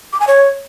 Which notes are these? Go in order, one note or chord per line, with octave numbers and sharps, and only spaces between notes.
D6
G#5
C#5